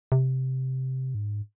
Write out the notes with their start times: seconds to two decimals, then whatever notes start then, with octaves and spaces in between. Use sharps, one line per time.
0.12 C3
1.15 G#2